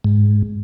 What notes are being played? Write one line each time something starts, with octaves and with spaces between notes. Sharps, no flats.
G#2